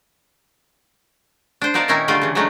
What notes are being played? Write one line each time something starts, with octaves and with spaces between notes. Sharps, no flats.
D4 C5
B3 D#4 A#4 D5 F5 A5
A#2 D#3 C#4 D#4 E4 A#4
D3 G3 A3 F4 D5
C#3 E3
F#3 G#3 A3 D4 D#4